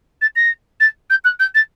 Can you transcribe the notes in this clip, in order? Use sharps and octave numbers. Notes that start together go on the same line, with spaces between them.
A6
A#6
A6
G6
F#6
G6
A6